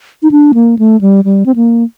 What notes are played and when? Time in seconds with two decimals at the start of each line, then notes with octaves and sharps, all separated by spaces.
0.23 D#4
0.31 D4
0.54 A#3
0.79 A3
1.01 G3
1.25 G3
1.46 C4
1.56 A#3